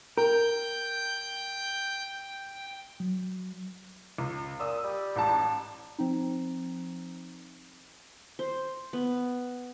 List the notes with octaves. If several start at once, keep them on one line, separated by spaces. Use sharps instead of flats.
A#4 G5 G6
F#3
C#2
A#2 D#6 E6
G3
A1 G#2 A5
F3 C4 D#4
C5
B3